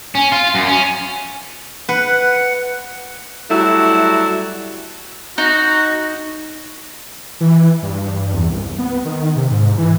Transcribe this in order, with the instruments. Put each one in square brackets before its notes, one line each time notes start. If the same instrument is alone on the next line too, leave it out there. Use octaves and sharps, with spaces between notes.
[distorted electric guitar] C#4
F4
F#2
C#4
[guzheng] B4 [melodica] F#5
[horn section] F#3 G3 A3 E4 F#4
[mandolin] D#4 [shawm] F#4
[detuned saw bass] E3
G2
E2
C2
B3
D#3
C3
G#2
E3